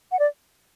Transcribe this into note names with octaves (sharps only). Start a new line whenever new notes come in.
F#5
D5